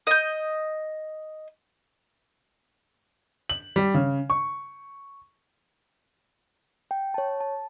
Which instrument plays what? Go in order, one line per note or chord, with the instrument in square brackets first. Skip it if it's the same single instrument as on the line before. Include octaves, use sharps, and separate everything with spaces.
[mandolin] D#5 G6
[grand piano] F#7
G3
C#3
C#6
[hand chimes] G5
C#5 A5
A5